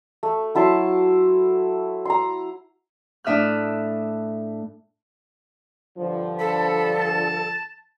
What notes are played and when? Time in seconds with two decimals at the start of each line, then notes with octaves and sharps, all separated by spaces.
0.23 A3
0.55 F#3 E4 A5 C6
2.05 A#5 C6
3.24 A2 D4 E5 D#6 F6 F#6
5.98 G2 D3 F3
6.39 A4 B5
7.00 A5